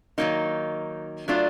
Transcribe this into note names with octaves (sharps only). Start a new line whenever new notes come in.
D#3 F#3 A#3 D#4
F#3 A3 D4 F4